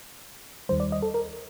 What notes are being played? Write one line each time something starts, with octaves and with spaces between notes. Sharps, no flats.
D#2 D#3 G3 C5
D5
D#5
A4
A#4